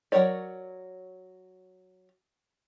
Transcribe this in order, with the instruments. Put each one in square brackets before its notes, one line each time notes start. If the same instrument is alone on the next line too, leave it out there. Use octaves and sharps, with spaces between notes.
[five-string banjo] F#3 A#3 A#4 C#5 D5